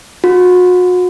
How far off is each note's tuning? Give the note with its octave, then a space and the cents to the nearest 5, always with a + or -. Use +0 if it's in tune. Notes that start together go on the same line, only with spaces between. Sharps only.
F#4 -40